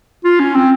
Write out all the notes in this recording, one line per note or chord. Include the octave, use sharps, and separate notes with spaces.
F4
C#4
C4